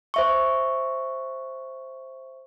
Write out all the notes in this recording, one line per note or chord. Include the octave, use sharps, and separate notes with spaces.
C5 E5 C#6